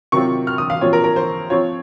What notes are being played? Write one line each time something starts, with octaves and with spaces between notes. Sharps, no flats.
C3 D#3 F#3 C4 F4 C#6
F6
D#6
F5
A#2 F3 C4 F4 C#5
A#4
A#4
C5
F3 C4 F4 C#5